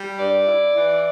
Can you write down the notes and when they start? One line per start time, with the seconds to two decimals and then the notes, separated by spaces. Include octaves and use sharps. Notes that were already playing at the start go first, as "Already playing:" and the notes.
Already playing: G3
0.19 G2 D5
0.47 E4
0.76 E3